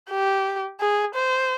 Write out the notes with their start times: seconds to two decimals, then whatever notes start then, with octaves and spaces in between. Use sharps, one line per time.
0.10 G4
0.80 G#4
1.15 C5